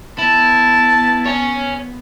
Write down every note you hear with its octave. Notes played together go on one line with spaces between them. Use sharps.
B3 E4 A5
C#5 G#5